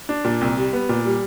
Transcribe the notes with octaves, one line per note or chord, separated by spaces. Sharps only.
D4
A#2
C2
G3
B3
A#2
G3